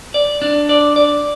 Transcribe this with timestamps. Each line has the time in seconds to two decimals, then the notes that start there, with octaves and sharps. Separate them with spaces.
0.14 D5
0.42 D4
0.69 D5
0.96 D5